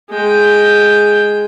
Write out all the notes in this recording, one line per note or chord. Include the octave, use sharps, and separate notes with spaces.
G#3 G5